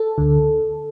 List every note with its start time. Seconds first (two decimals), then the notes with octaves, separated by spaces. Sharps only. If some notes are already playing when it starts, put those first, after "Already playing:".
Already playing: A4
0.18 D2 D3